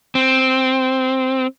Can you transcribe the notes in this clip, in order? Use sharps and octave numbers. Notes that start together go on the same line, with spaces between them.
C4